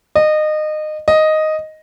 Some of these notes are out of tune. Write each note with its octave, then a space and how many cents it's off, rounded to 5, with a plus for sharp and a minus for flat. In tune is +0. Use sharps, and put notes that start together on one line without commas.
D#5 -25
D#5 +0